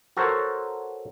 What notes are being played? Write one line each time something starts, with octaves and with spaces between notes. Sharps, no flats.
F#4 A4 A#4 C5 C#5